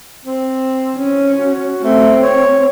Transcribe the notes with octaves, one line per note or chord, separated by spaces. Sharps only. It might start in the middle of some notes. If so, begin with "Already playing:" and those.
C4
C#4
F#4
A3 C4
C#5